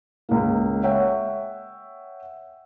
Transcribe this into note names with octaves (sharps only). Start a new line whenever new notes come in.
C#2 A#3
C#5 E5 F#5 G5